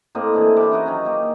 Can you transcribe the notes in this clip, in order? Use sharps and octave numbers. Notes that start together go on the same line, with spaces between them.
A2 A#3 C4 D#5
D3 E3 G#4
C3 E5 B5 D6
C#4 D#4 F#4 D#5
D#3 F#3 C#4
A#3 G4